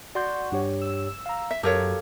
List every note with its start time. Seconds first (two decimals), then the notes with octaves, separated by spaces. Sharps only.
0.15 F#4 D5 C6 G6
0.52 G2 G4 C#5
0.82 E6
1.26 F5 A#5
1.51 E5
1.63 F#2 G4 A4 A#4 C#5 F5